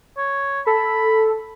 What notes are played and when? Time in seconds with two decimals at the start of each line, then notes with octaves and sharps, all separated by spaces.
0.17 C#5
0.67 A4 B5